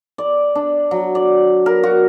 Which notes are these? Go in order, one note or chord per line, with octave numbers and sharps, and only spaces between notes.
D5
D4
F#3
D5
A#4
F#4